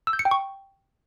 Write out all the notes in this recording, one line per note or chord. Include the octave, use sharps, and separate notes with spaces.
E6
G6
C#7
G5
C#6